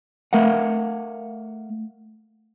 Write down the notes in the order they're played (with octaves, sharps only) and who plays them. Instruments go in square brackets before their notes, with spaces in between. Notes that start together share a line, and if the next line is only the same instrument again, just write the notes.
[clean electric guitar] A3 A#4 F5 F#5